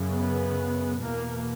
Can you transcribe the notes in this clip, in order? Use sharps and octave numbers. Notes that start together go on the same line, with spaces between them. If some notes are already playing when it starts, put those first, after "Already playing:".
Already playing: F#2 C#3
B3
E2 B2 A#3